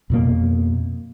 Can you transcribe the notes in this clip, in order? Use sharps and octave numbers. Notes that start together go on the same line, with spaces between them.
F2 B2 A#3